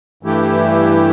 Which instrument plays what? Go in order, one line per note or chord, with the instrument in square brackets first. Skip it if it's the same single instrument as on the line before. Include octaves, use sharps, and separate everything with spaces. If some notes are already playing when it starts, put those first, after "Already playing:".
[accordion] G2 E3 A3 E4 G4